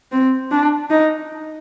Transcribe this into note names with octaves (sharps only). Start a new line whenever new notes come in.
C4
D4
D#4